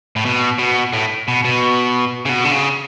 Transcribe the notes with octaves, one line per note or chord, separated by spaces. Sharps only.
A2
B2
B2
A2
B2
B2
C#3
B2
D3
C#3